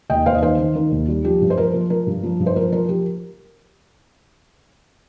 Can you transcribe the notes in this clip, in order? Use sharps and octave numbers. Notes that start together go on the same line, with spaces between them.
D#2 D#5 G5
D#2 C5 F5
D#5
D#3 C5 F5
D#3
D#3
D#2
G3
F3 G4
G2
C5
F3 A#4
F3
F3 A#4
G2
F3
G2
C5
F3 A#4
F3 A#4
F3 G4